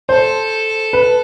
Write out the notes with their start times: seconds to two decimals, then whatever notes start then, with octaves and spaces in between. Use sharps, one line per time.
0.09 A4 C5
0.93 B4